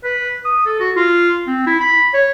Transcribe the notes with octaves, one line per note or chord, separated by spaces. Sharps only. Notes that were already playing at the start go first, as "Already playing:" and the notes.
B4
D#6
A4
F#4
F4
C4
E4
B5
C#5